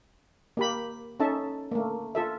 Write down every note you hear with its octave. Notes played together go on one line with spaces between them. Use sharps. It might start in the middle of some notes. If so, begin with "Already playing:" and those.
A#3 G4 B5
C#4 D#4 A4 E5 A5
A3 A#3
F4 A4 E5